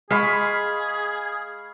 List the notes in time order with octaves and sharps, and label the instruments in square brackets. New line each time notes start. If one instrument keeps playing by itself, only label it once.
[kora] G#3 [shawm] G#4 [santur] F5 B5 C#6